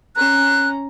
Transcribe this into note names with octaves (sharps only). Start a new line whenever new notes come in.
C#4 A#5 F#6